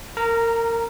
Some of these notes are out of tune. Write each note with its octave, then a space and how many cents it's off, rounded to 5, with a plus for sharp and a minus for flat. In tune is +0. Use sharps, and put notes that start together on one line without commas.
A#4 -20 A#5 +0